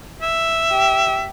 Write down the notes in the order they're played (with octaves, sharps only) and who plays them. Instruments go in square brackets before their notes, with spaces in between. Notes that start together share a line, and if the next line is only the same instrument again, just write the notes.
[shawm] E5
[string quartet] G4